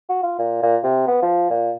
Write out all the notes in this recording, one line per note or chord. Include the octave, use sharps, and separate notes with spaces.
F#4
F4
A#2
A#2
C3
B3
F3
A#2